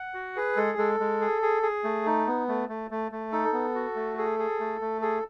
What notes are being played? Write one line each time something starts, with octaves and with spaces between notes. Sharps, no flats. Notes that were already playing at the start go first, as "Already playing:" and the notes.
Already playing: F#5
F#4
G#4 B4
G#3 A4
G#3 A4
G#3
G#4
G#4
G#4
A3
D#4
B3
A3
A3
A3
A3
D#4 A4
B3
F#4
A3
G#4 A4
G#4
A3
A3
G#4 A4